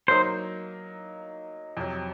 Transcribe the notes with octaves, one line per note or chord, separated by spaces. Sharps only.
F#3 A#3 D#4 A#4 C5 D#5
F2 C3 F#3